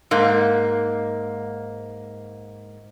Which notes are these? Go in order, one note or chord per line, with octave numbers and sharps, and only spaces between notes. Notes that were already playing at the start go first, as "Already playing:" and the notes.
G#2 A#3